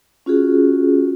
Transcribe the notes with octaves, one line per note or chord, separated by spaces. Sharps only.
C#4 F4 F#4 G#4